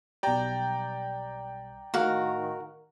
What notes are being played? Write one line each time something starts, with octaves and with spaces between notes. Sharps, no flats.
B1 G3 D5 G5 A#5
A2 D#3 F#4 A#4 F5